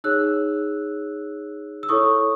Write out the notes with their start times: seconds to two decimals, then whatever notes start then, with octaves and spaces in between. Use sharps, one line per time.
0.04 D#4 G#4 C#5 E6 F#6
1.83 E6
1.89 E4 A4 C#5 C#6 D#6